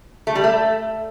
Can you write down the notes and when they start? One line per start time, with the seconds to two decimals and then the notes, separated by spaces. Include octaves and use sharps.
0.27 A3
0.35 G3
0.44 A3